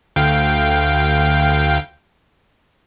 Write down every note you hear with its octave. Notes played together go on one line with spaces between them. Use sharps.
D2 F5 G5